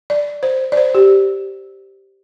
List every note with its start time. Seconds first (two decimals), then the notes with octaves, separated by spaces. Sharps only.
0.10 D5
0.43 C5
0.72 D5
0.77 C5
0.95 G4